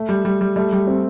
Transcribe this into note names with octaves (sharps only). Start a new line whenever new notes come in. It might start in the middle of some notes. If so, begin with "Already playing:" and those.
Already playing: A3
G3
G3
G3
G3 A3
G3
C4